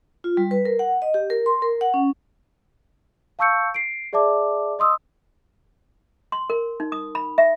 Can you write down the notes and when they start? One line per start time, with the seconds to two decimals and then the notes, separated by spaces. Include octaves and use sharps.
0.24 F4
0.37 G3
0.51 B4
0.65 A#4
0.79 F#5
1.02 D#5
1.14 G4
1.30 A#4
1.46 C6
1.62 A#4
1.81 F#5
1.94 C#4
3.39 F5 A5 C#6 E6 G6 C#7
3.74 C7 D7
4.13 G#4 D5 E5 A5 D6
4.79 D#5 C6 D#6 E6
6.32 C6
6.50 A#4
6.80 D#4
6.92 D#6
7.15 B5
7.38 E5